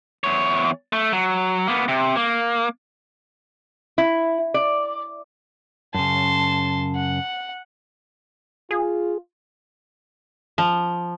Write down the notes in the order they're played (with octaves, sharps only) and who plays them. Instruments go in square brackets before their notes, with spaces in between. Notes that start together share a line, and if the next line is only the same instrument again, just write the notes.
[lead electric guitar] E2 C#5
A3
F#3
A#3 B3
C3
A#3
[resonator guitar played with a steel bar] E4
D5
[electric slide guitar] F#2 C#3 [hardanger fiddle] A5 C6
[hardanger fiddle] F#5
[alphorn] F4 [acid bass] G#4
[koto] F3